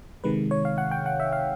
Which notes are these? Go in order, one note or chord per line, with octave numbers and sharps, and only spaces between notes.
C3 D#3 G#3 B4
C#5
F5
F#5
G5
F#5
E5
F5